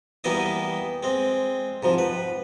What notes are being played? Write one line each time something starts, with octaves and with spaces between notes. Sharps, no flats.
E3 G3 A#3 B3 E4 D#5
G#3 C4
G#2 C3 F3
B4